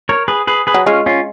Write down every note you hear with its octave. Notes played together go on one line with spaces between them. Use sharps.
A#4 C#5
G#4 B4
G#4 B4
G#4 B4
F#3
G#3 C#4 F4
C#4 F4